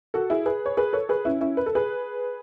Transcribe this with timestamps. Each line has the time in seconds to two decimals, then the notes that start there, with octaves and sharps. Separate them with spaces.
0.14 F#4 A4
0.30 E4 G#4
0.46 G#4 B4
0.66 C#5
0.77 G#4 B4
0.93 A4 C#5
1.09 G#4 B4
1.25 C#4 E4
1.41 C#4 E4
1.57 B4
1.66 A4
1.75 G#4 B4